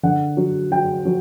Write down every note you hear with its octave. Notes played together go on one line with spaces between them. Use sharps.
D3 F#5
F#3
F#3 G5
F#3